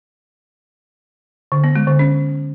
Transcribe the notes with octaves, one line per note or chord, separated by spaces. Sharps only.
D3
B3
G#3
D3
C#4